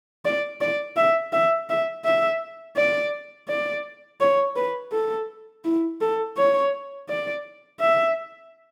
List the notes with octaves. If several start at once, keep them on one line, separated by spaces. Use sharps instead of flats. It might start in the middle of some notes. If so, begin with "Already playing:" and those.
D5
D5
E5
E5
E5
E5
D5
D5
C#5
B4
A4
E4
A4
C#5
D5
E5